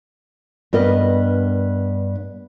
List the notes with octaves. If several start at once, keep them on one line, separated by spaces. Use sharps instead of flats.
G2 B3 A#4 D#5